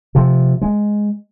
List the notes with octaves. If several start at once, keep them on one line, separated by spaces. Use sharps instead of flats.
C3 F3
G#3